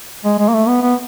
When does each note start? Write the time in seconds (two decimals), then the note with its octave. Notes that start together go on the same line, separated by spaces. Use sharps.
0.24 G#3
0.38 G#3
0.49 A#3
0.54 A3
0.68 B3
0.82 B3